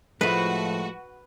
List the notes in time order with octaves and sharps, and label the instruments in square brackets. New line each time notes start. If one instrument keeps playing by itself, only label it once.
[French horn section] A2 F3 [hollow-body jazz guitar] G#3 A3 [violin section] F#4 [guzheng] B4